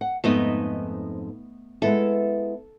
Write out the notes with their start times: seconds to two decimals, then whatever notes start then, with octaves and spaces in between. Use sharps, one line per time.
0.01 F#5
0.24 F2 G#2 A3 B3 D#4 D#5
1.82 G#3 B3 E4 A4